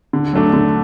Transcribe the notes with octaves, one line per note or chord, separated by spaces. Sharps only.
D3
F#3 A3 D4
D3